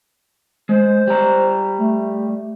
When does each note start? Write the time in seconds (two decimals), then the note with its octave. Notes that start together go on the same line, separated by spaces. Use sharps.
0.69 G#3 C5
1.08 G3 A#5
1.79 A3